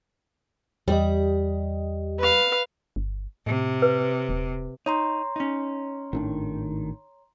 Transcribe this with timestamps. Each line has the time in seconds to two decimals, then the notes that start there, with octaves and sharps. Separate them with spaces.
0.88 E2 G3 G4 D#5
2.18 B4 F5
2.96 G1
3.47 A2 C3
3.82 B4
4.29 D#1
4.86 D#4 C#5 A#5 C6
5.36 C#4 D#4
6.13 G#1 A2 D#3 D4